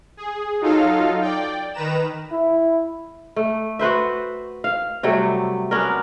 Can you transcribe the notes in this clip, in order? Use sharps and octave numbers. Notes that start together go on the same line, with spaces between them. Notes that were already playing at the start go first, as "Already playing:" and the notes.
G#4
F#3 D#4 F4 A4 F5
D5 G5
D#3 B4 A#5 E7
E4
A3
F#4 B4 C5 E5
F5
C3 F#3 G3 A3
B3 C#4 D4 A#4